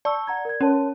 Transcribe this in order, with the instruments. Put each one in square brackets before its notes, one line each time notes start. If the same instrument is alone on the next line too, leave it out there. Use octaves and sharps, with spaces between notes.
[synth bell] D5 [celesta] A5 C#6 E6
[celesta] F#5 A#5 G#6
A#4 G#6
[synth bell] C#4 [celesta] A#4 C#5 A5